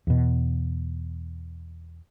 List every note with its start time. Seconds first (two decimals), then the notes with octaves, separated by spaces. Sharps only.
0.07 E2 B2